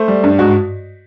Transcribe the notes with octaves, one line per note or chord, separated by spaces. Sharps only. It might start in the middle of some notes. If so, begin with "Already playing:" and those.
Already playing: A3 C5
G3
G2
G#2 F#4